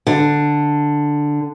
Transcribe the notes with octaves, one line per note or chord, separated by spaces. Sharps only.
D3